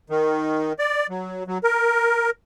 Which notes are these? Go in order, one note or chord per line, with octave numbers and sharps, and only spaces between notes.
D#3
D5
F#3
F#3
A#4